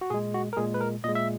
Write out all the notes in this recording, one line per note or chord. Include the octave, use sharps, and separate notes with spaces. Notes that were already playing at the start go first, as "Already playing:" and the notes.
F#4
A#2 G#3 G#4
F#4
A#4
A#2 G#3 G#4
B4
A#4
A#2 G#3 D#5
E5